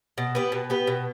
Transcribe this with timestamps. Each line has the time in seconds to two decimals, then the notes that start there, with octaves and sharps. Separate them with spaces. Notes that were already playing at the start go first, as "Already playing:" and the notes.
0.18 B2
0.35 B3 G4 B4
0.52 B2
0.70 B3 G4 B4
0.87 B2